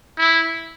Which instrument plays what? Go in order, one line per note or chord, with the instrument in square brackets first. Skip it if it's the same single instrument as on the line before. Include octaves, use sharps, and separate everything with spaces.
[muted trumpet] E4